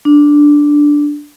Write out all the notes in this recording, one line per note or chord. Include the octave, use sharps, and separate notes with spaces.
D4